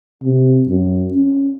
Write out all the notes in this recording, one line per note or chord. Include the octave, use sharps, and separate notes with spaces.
C3
F#2
C#4